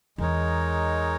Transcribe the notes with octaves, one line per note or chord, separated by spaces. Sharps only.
E2 G#3 D#4 A#4 C#5